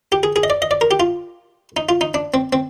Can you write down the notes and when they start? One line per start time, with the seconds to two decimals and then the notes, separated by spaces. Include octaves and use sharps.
0.12 G4
0.23 G#4
0.36 G#4
0.43 D#5
0.50 D5
0.62 D#5
0.71 D5
0.81 A#4
0.91 G4
1.00 F4
1.77 D#4
1.89 F4
2.01 D#4
2.14 D4
2.34 C4
2.53 C4